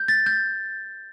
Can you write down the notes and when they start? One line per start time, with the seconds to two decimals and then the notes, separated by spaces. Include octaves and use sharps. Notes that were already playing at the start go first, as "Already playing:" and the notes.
Already playing: G6
0.08 A6
0.26 G6